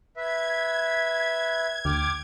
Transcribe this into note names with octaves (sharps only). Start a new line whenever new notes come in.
B4 E5 G#6
D2 G5 D6 F6